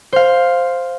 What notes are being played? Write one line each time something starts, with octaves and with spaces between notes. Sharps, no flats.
C5 F5